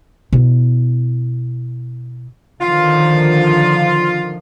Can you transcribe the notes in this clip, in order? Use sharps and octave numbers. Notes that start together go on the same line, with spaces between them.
B2 E4
D3 D#3 F3 F4